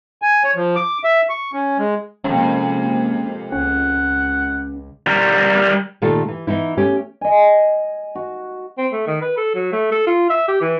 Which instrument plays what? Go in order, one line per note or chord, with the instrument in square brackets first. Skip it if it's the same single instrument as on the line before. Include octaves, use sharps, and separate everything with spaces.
[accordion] G#5
C#5
F3
D6
E5
C#6
C#4
G#3
[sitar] F2 G#2 [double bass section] C3 G#3 A#3 [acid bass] C#4
[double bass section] C#2 [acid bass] C#4 [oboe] F#5
[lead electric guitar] G3 A#4
[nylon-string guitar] A#2 D#3 A3 F4 G4 A4
E3
E3 B3 D#4 E4
A3 C#4 G4
[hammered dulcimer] D#5 G#5
F#4
[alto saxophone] C4
A3
D#3
B4
A4
F#3
A3
A4
F4
E5
G4
E3